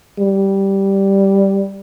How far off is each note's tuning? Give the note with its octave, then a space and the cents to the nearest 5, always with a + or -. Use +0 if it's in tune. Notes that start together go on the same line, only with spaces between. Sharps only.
G3 -5